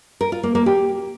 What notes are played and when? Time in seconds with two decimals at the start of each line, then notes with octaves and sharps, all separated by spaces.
0.21 A#4
0.32 F4
0.43 A#3
0.55 A#3
0.66 G4